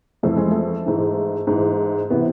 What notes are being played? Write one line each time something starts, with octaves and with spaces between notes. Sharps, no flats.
F2 E3 A3
G#3
A3
G#2 E3
G#2 E3
C3 E3 B3